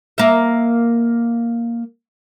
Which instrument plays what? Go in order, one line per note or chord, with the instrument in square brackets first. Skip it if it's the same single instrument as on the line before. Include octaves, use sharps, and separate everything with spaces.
[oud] A#3 E5